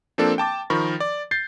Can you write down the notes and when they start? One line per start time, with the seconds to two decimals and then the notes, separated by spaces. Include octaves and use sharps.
0.18 F3 A#3 C4 D4 A4
0.38 G5 A5 D6 A6
0.70 D#3 F3 A#4 B5 C#6
1.00 D5
1.31 G6 A6 C7